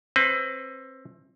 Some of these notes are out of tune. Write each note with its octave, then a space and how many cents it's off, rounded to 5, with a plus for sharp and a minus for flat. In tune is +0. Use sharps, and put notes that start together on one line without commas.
C4 +25 B4 +30